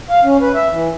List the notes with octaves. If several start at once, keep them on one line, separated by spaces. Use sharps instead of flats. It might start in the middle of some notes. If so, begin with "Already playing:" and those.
F5
C#4
B4
E5
E3